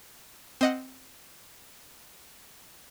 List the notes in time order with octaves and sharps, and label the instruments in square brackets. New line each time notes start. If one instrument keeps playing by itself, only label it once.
[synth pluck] C4 D#5 F#5